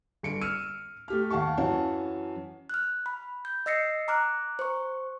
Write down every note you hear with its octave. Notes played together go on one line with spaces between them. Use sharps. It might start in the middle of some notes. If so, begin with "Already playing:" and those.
G1 C#7 D7
E6 F6 C#7 D#7
A3 G4 F6
D#2 F5 F#5 A5 C#6
F#2 E3 C#4 F#5 A5
F6 F#6
B5
G6
D#5 E6 A#6 C7 C#7
A#5 D6 F6 F#6
C5 C#6